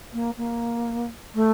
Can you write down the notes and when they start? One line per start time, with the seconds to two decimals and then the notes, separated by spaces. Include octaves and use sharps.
0.13 A#3
0.37 A#3
1.34 A3